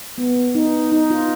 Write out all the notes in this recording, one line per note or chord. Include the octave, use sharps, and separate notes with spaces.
B3
D#4
D#4
F4